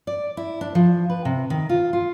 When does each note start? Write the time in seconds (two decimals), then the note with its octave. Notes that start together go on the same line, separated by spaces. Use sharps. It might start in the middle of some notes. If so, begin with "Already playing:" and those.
0.07 D5
0.37 E4
0.61 D4
0.75 F3
1.10 B4
1.25 C3
1.50 D#3
1.69 F4
1.93 F4